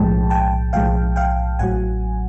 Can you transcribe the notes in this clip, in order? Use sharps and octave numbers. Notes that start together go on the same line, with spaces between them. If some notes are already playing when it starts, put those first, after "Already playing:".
Already playing: B1 A2 F3 G#3 G5 A5
G5 A5
B1 A2 F3 G#3 F5 G5
F5 G5
A1 A2 F#3 F#5 G#5